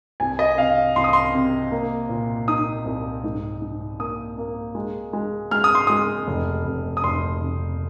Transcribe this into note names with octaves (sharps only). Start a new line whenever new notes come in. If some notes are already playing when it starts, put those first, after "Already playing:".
C2 G#5
D#5
C3 F5
C2 C6
D#6
C6
C3
A#3
A#2
D#4 D#6
C2
G#2
G#2
A#3 D#6
A#3
G#3
G#3
G#3 F6
D#6
C6
G#3 D#6
F1
F1
D#6
F1 C6
F1